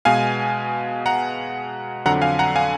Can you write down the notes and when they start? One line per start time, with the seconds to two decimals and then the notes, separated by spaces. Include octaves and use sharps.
0.05 B2 G#3 B3 F5 G#5
1.06 F#5 A#5
2.05 F2 D3 F#3 F#5 A#5
2.22 F5 G#5
2.39 F#5 A#5
2.56 F5 G#5